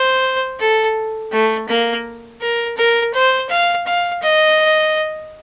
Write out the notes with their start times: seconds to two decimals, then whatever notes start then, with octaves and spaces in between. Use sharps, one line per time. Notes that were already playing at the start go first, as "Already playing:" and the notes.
Already playing: C5
0.59 A4
1.31 A3
1.68 A#3
2.41 A#4
2.77 A#4
3.14 C5
3.49 F5
3.87 F5
4.22 D#5